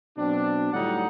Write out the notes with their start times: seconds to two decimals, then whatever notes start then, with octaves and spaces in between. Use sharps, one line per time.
0.18 B2 F#3 C4 D4
0.73 A2 D3 F#3 G3 D#4 F#5